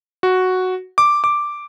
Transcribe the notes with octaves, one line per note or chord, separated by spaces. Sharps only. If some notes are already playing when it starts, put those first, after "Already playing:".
F#4
D6
D6